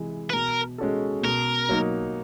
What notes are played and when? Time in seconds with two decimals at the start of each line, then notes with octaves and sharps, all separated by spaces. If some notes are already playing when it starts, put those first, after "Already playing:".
Already playing: C3 E3 G#3
0.30 B4
0.33 B2 A#4
0.78 G#3 C#4 F#4 A4
1.23 B2 A#4
1.69 F#3 A#3 D#4